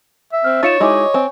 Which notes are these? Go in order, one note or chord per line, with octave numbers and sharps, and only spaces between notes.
E5
C4 F6
D#4 F4 C#5 A6 C#7 E7
G#3 D#4 E4 F#4 D#5 G#5 D6
C4 G#5